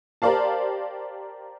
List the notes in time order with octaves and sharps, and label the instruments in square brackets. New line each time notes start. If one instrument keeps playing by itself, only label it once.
[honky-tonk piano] G4 A#4 C5 D5 F5 A5